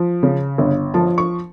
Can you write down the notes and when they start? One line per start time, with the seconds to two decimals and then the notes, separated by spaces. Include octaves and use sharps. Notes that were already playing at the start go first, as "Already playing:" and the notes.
Already playing: F3
0.23 C#3
0.58 G1
0.94 F3 A5
1.18 C#6